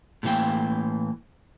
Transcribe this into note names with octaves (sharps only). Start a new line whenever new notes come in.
A2 C3 E3 A#3 G5